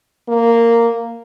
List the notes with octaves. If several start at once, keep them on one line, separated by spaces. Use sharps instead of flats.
A#3